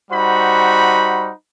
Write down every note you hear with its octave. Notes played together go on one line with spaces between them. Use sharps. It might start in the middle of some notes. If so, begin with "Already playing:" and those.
G3 D#4 F#4 C5 F#5 B5